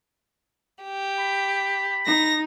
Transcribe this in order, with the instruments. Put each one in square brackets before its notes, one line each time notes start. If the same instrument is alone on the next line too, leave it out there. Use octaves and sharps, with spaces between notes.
[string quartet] G4
[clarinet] B5
[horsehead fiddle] D#4 [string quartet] A#6